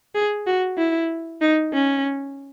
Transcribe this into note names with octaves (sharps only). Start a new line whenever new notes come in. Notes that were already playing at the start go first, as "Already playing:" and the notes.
G#4
F#4
E4
D#4
C#4